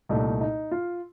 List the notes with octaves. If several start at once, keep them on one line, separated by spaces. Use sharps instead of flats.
C2 A#2 A3 D#4
D#4
F4